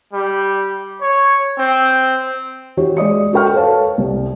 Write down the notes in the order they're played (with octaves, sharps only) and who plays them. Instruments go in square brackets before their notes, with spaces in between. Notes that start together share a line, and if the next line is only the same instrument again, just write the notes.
[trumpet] G3
C#5
C4
[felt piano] E3 E4 F#4 G4 C#5
G#3 D5 D#6 C#7
F#4 A4 A#4 G5 C#6 F6
A4 B4 C#5 F5 A5
C2